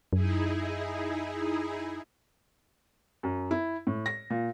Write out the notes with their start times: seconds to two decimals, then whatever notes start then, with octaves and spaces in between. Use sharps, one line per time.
0.13 F#2 D#4 E4 G#4
3.23 F#2
3.51 E4
3.87 A2
4.06 A#6
4.30 A#2